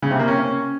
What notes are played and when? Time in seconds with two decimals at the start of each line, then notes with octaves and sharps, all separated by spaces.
0.02 C#3
0.11 C3
0.19 A#3
0.28 C#4